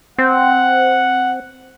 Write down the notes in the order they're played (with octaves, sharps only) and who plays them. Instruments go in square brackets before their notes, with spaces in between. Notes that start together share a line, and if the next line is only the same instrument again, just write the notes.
[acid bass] C4 [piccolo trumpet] F#5